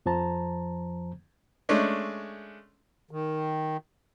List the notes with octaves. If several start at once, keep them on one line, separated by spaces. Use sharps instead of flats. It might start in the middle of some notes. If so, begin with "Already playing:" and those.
F2 F3 C5 A5 A#5
G#3 A3 C#4 D4
D#3